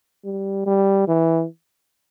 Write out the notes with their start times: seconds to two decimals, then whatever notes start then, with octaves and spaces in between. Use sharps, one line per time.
0.25 G3
0.66 G3
1.08 E3